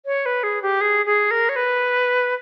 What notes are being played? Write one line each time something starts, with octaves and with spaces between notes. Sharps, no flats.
C#5
B4
G#4
G4
G#4
G#4
A#4
C#5
B4